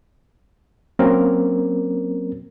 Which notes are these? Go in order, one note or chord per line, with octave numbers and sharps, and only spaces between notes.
F#3 A#3 C4 C#4 A#4